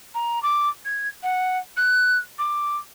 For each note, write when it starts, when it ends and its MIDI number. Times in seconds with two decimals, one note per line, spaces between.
0.15 0.42 82
0.43 0.69 86
0.85 1.08 92
1.23 1.58 78
1.77 2.18 90
2.39 2.77 86